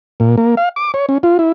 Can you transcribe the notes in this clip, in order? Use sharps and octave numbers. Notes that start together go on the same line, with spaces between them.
A#2
A#3
F5
D6
C#5
C#4
F4
E4